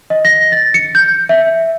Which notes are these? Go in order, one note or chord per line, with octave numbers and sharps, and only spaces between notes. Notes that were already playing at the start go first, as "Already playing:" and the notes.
D#5
A#6
A6
C#7
G6
E5